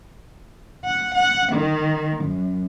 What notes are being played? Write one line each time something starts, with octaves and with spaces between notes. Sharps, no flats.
F#5
F#5
D#3
F#2